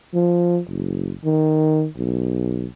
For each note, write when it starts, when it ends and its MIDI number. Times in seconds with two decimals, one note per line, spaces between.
0.14 0.60 53
0.68 1.14 30
1.25 1.87 51
1.97 2.67 35